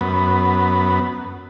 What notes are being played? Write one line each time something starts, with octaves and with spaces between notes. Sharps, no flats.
F#2 B3